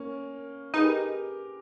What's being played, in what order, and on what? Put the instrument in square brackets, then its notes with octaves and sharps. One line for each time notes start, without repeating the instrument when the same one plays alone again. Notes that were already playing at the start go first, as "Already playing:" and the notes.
Already playing: [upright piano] A#3 C#4
[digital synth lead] D#4 [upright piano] G#4 B4
[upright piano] G4 A#4